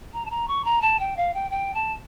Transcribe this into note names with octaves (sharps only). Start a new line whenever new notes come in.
A#5
A5
A#5
C#6
A#5
A5
G5
F5
G5
G5
A5